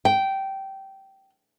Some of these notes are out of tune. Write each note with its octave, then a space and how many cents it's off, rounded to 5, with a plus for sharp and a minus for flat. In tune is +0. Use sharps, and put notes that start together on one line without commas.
G5 -15